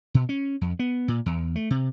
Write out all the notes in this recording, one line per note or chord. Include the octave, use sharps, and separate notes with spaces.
B2
C#4
F2
B3
A#2
E2
A3
C3